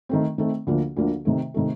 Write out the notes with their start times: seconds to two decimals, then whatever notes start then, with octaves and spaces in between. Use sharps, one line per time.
0.09 D#3 A3 C4
0.38 D#3 A3 C4
0.67 D2 D3 F3 A#3
0.97 D2 D3 F3 A#3
1.25 C3 D#3 A3
1.54 C3 D#3 A3